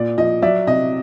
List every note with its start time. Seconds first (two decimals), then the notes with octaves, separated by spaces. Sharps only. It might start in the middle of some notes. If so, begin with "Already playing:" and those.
Already playing: A#2 D5
0.18 F3 D#5
0.42 F#3 D5 E5
0.67 C3 D#5